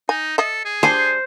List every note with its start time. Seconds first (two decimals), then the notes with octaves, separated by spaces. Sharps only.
0.09 D#4 G#5
0.38 A4 D#5 E5
0.65 G#4
0.83 G3 D4 C5 G#5